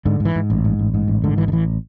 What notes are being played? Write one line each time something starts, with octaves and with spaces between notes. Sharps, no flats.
G#2 D3
G#2
E3
G#2
A1
G#2
A1
G#2
A1
G#2 D3
A1 E3
D3
A1 E3